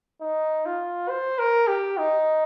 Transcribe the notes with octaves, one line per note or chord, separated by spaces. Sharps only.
D#4
F4
C5
A#4
G4
D#4